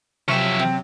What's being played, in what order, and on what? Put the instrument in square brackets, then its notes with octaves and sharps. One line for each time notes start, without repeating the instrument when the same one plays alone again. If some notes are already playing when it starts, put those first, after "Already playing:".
[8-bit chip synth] C3 F#3 [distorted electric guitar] F3 E5 [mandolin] G5 C#6
[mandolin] C4